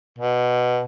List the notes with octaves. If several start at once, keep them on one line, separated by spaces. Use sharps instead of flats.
B2